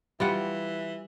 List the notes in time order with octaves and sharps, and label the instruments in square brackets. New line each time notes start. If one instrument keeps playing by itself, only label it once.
[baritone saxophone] E3 [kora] G3 F4 F#5